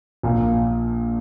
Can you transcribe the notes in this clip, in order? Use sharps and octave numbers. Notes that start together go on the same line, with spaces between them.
A#1 A#2 A#3